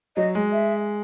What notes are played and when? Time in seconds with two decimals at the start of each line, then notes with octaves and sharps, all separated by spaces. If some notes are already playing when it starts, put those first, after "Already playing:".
0.17 F#3 D#5
0.35 G#3
0.52 E5